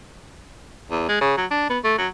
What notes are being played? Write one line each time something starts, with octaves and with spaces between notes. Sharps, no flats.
E2
G#3
C#3
F#3
D4
B3
A3
F#3